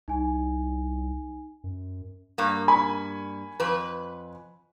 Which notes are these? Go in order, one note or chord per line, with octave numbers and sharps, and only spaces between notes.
C2 D#4 G#5
F#2
G2 A#3
G#5 B5 C#6
F2 B4